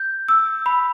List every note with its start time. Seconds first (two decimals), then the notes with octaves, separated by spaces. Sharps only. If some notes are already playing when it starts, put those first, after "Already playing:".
Already playing: G6
0.28 E6
0.66 B5